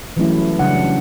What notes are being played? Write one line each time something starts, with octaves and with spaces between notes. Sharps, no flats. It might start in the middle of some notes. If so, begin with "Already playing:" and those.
E3 F#3 G3 A3 C#4 E4
C#3 F#3 G3 D4 F#5